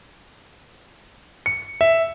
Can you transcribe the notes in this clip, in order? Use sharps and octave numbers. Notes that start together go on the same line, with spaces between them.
C#7
E5